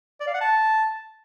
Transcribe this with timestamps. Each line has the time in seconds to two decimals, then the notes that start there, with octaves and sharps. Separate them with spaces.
0.21 D5
0.27 F5
0.34 F#5
0.41 A5